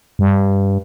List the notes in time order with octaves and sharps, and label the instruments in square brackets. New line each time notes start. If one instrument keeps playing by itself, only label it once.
[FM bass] G2